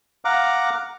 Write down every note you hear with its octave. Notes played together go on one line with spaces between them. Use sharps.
F5 F#5 A#5 D6